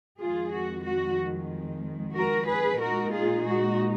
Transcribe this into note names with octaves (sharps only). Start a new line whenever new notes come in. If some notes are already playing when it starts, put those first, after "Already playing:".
F2 D#3 G#3 F4 G#4
F#4
F#4
F#4 A#4
G#4 B4
A#2 G#3 D#4 F#4 A#4
F4 G#4
F#4